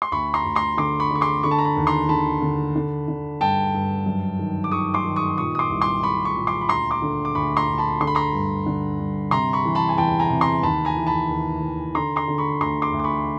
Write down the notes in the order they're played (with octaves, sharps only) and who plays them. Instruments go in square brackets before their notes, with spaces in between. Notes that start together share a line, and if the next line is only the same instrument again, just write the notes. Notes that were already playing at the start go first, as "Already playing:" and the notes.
[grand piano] C6
D2 B5 C#6
A#5 C6
D2
A#5 C6
D3 C6 D6
B5 C#6
D3 C#6
C6 D6
D3 B5 C#6
A5
A#5
A5 B5
D#2
A#5 C6
D3 A5 B5
D3
D3
D3
G2 G5 A5
G2
F#2
D#3
D6
D#3 C#6 D#6
C6 D6
D#3
C#6 D#6
A#2 C#6 D#6
D#6
C6 D6
C2
C6 D6
A#2 B5 C#6
B5 C#6
A#2
C6 D6
B5
D2 A#5 C6
C6 D6
D3
D6
D2 B5 C#6
A#5 C6
D2
A5 B5
D3 C6
B5
A#5 C6
G2
D3
G2
C3 A#5 C6
B5 C#6
E3
A5 B5
G#5
E2 G5 A5
G#5 A#5
C3
A#5 C6
D#2 A5 B5
G#5 A#5
E3
A5 B5
D#2
E3
D3 A#5 C6
A#5 C6
D3
B5 C#6
D2 A#5 C6
C6 D6
D2
D6
B5 C#6